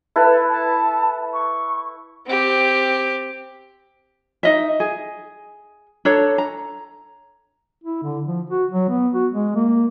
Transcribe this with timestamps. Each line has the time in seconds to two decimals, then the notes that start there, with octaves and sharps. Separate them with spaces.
0.16 E4 A4 B4
0.50 A5
1.33 C#6
2.26 C4 G4
4.43 D#4 D#5 E5
4.80 G#4
6.05 D4 A4 C#5 A#5
6.38 A#5
7.84 E4
8.03 D3
8.27 F3
8.50 F#4
8.71 F#3
8.89 B3
9.14 F#4
9.32 G#3
9.55 A#3